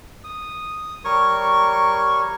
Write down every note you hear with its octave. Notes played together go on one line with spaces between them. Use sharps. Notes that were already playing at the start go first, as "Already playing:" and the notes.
D#6
G3 A#4 C#5 C#6